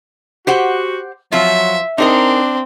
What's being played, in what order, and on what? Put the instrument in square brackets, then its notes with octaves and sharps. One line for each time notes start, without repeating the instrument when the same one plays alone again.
[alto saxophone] F#4 [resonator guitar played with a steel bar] G4 C5 F#5
[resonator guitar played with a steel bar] F3 C4 F4 [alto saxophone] F#3 [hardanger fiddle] E5
[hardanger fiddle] C4 [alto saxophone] D4 [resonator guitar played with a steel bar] D#4 G#4 A#4